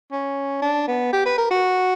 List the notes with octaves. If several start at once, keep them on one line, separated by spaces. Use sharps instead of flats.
C#4
D4
B3
G4
B4
A#4
F#4